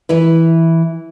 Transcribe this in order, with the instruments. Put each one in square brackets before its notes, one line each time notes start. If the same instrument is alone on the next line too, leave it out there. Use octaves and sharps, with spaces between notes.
[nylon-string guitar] E3 E4 B4